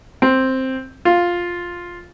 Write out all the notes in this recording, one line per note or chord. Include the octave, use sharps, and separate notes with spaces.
C4
F4